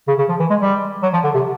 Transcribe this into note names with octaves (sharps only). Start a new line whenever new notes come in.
C#3
C#3
F3
E3
G#3
G3
F#3
F3
D3
C3